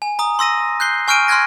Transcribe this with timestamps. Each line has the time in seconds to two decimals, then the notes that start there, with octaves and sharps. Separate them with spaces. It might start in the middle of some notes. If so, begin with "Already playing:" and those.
0.02 G#5
0.19 A#5 D#6
0.39 C6 E6 A#6 D#7
0.80 F#6 G6 C7 G7
1.08 G#5 C#6 F6 G6 D7 D#7
1.28 C6 F6 F#6 G#6 A#6